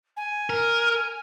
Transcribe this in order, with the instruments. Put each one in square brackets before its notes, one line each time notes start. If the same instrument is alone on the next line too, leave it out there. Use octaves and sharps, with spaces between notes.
[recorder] G#5
[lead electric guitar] A#4